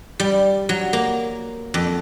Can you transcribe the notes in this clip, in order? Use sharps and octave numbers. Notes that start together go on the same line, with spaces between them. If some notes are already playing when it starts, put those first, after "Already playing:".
G3
F#3
A#3
F2